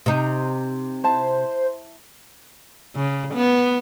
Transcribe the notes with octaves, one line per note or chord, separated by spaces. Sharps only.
C3 D#4
E4 C5 A5
C#3
B3